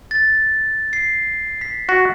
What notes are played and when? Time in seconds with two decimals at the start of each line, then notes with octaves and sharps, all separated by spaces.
0.11 A6
0.93 C7
1.61 B6
1.89 F#4